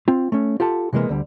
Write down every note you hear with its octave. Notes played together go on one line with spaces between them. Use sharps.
C4 F4
A3 C#4
F4 G4 A4 F#5 A5
C3 E3 G#3 A#3 B3
D2 D3 G3